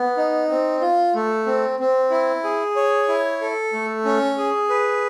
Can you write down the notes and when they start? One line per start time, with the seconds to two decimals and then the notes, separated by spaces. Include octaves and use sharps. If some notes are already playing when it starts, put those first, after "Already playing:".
Already playing: B3
0.17 D#4
0.50 C4
0.81 F4
1.15 A3
1.46 C4
1.79 C4
2.11 E4
2.44 G#4
2.76 C#5
3.08 E4
3.41 A4
3.73 A3
4.05 C#4
4.38 G#4
4.70 B4